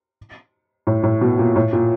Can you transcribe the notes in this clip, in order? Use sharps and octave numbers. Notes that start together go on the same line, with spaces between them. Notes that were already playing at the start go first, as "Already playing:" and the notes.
A2
A2
B2
A#2
A2
A#2